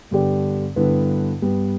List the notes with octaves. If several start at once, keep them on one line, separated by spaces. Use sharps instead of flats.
G2 D3 B3 G4 D5
G2 D3 B3 E4 B4
G2 G3 B3